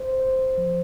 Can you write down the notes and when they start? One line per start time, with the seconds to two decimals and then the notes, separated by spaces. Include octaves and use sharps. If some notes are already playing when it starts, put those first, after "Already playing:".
Already playing: C5
0.20 C5
0.58 F3